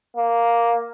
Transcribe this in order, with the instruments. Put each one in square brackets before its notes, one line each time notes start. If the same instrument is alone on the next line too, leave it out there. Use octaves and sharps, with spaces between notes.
[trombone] A#3